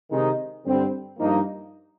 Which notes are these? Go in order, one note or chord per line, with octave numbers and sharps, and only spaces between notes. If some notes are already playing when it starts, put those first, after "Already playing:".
C3 D#3 G#3 D#4
G2 D3 G3 C4
G2 F3 A#3 D#4